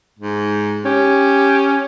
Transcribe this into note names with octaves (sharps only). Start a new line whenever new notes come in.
G#2
C#4 G4